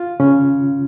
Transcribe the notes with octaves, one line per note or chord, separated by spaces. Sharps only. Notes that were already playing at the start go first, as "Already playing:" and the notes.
Already playing: F4
C#3 C#4